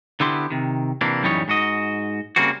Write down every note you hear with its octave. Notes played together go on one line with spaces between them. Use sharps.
D3 B3 E4 G4 C6
C3 D#3
C3 E3 A#3 D4
F#2 A2 E3 G3 D#4 C#5
G#2 F#4 D#5
C#3 G3 A#3 C4 F#4